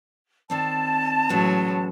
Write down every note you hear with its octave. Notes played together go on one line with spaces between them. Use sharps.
D#3 C4 D5 A5
E2 A2 F#3 G#3 C#4